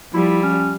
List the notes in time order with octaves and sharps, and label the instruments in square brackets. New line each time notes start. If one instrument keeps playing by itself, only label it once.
[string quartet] F3 G3 [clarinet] E4
[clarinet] C#4